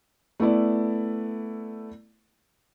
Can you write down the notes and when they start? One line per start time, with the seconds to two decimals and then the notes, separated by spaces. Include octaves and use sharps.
0.40 A3 B3 E4 D5